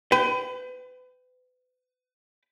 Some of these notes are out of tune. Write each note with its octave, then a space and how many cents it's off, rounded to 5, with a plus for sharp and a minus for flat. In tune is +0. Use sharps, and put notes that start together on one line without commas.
B4 +35 G5 +0